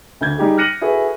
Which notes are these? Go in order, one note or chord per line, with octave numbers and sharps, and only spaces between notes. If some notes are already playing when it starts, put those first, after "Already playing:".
D2 D3 G6 G#6
G3 D#4 G4 G#4
F6 F#6 A#6 C#7 D#7 F#7
E4 F#4 G#4 A4 B4